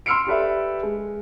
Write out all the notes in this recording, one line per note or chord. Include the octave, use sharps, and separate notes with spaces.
C6 E6 F6 C#7 D7
G4 A4 B4 D5 E5
G#3